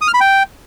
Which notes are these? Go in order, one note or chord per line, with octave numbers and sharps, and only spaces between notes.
D#6
F6
B5
G5